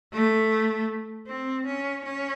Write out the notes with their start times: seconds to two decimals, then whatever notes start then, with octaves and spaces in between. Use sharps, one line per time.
0.13 A3
1.27 C4
1.66 C#4
2.05 C#4